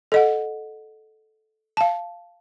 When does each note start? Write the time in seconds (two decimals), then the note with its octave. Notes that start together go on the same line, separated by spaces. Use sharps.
0.12 A4 D#5 F#5
1.77 F5 A5